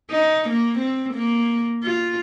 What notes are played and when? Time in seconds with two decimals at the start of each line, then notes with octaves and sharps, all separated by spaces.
0.10 D#4
0.49 A#3
0.78 C4
1.14 A#3
1.83 F4